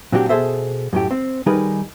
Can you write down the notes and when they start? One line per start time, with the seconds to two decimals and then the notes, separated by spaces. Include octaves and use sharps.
0.12 A#2 F#3 C4 D4 F#4 G4
0.29 B2 G#4 A4 C5 E5
0.93 F#2 A2 G4
1.11 C4
1.46 D#3 G3 D#4 G#4 A#4 B4